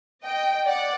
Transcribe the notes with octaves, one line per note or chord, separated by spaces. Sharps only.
D#5 G5
D5 F#5